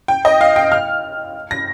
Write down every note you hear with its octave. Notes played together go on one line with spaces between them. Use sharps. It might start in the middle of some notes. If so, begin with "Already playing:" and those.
G5
D#5
F5
G5
F6
A#6